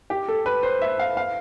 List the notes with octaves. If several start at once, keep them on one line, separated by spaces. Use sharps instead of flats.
G4
A4
B4
C5
E5
F5
F5